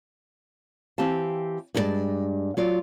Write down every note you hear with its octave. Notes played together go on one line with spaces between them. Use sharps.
E3 C4 G4 F5 A5
G2 G#3 D#4 F4 D5 A5
F#3 F4 D5